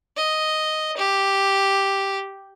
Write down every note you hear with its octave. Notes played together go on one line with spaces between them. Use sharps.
D#5
G4